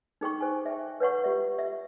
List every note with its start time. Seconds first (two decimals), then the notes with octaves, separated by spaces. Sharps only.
0.21 D#4 G#4 G5 C#6
0.41 C5 G#5
0.66 E5 G5
1.00 B4 C#5 F#5 C#6
1.24 F4 G4 E5
1.59 E5